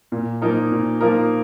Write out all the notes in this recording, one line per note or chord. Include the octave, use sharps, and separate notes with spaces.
A#2
F3 A#3 D#4 A#4
A#2
F3 A#3 D#4 A#4